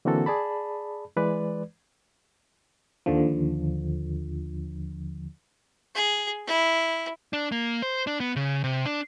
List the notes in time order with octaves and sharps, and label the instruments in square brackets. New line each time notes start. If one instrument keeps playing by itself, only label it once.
[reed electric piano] D3 E3 A#3 C4 F#4 A4
G#4 D5 A5 B5
E3 G#3 B4 D5
[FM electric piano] D#2 D3 F3
[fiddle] G#4
E4
[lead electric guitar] D4
A#3
C5
D4
B3
C#3
C3
D4